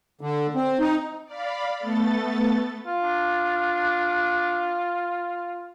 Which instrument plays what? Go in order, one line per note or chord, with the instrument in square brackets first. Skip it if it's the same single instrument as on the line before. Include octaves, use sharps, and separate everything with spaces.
[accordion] D3
C4
D#4
[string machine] D5 F5 B5
A3 B3 A4 A6
[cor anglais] F4
[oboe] D4